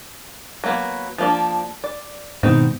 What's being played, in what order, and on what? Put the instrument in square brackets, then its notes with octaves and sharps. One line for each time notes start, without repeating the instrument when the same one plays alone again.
[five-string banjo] F#3 A#3 B3
F3 A#3 D4
D5
[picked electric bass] G#2 B2 D#3 [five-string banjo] C4 D#4